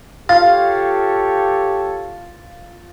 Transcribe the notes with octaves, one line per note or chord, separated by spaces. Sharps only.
F4 G4 A4 C#5 F5 A6